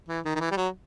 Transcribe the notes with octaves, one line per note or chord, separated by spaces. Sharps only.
E3
D#3
D#3
E3
G3
F#3